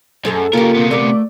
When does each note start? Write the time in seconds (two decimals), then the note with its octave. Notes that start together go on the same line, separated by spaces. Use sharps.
0.25 F#2 G#4 A4 C5
0.53 C#3 A#3 F4 G4 A#4
0.74 C3 B3
0.91 A3 A#4 D5